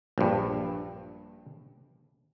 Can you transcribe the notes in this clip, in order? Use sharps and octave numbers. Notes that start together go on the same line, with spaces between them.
A#1 G2